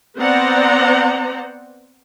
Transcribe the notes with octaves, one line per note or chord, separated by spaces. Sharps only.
B3 C4 C5 D5 F#5 A#5